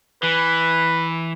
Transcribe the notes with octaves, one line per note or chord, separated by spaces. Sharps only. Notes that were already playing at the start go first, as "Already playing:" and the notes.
E3 B4